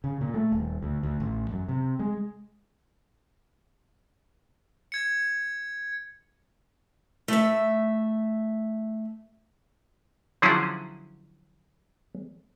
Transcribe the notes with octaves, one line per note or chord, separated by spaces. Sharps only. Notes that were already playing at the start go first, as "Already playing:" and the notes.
C#3
A#2
A3
D#1
D2
D2
A1
F#2
C3
G#3
G#6 C#7
A3 E5
D3 F3 F#3 C#4 E4 G#4